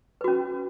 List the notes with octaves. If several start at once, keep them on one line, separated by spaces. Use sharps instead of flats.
C#4 F#4 B4